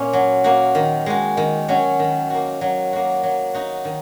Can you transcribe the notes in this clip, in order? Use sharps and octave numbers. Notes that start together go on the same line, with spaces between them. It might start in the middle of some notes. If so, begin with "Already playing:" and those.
Already playing: A#2 A#3 C#4
F#3
A#3 F#4
D#3
G#3 F#4
D#3
F#3 C#4 F#4
D#3
A#3 F#4
F#3
A#3 F#4
F#3
D#4 F#4
D#3